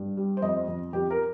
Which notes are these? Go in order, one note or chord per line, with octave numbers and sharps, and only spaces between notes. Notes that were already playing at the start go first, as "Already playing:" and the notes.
Already playing: G2
G3
C5
F2 D#5
F2
F2 G4
A#4